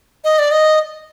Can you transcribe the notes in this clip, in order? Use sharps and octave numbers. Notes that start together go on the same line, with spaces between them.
D#5
D5
D#5